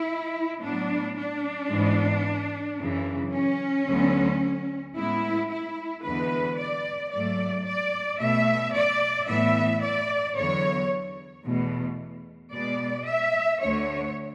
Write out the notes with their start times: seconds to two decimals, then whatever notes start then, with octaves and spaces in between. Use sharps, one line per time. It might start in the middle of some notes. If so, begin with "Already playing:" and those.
Already playing: E4
0.62 A2 F#3 B3 D4
1.17 D4
1.72 G#2 E3 G#3 B3
2.79 F#2 C#3 E3
3.33 C#4
3.88 D2 D3 F#3 B3
4.95 A2 G#3 B3 E4
5.50 E4
6.03 E2 D3 G#3 B3 B4
6.57 D5
7.12 G#2 F#3 A3 D5
7.65 D5
8.19 B2 A3 E5
8.74 D5
9.28 A2 E3 B3 E5
9.82 D5
10.36 E2 D3 F#3 C#5
11.44 E2 B2 A3
12.52 B2 G#3 B3 D5
13.06 E5
13.60 D2 D3 A3 C#5